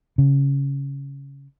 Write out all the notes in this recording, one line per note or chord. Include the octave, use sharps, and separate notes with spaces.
C#3